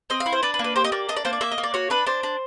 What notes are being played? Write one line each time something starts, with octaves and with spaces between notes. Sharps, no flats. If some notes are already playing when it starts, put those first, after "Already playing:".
C4 D#5
F5
E4
C5
D4 B4
B4
A#3
B4
G4 C5
D#5
A#3 D5
D4 D#5
D5
A#3 C5
D5
A#3 E5
D#5
A#3
D5
F#4 C#5
D4 B4
D4 C5
D4